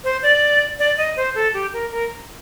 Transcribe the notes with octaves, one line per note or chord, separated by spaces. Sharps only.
C5
D5
D5
D#5
C5
A4
G4
A#4
A#4